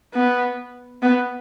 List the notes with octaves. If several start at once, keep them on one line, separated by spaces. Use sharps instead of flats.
B3
B3